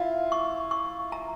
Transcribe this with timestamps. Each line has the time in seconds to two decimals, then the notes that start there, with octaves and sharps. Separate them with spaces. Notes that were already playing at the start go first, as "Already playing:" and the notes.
Already playing: E4 F4 F5
0.32 C#6
0.71 C#6
1.12 A#5